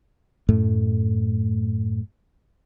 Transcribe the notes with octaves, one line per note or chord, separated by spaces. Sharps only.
F#2 A2 A3